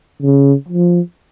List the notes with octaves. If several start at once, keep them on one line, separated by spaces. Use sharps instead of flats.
C#3
F3